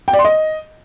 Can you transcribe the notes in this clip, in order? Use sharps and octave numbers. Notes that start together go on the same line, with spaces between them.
G5
D5
C6
D#5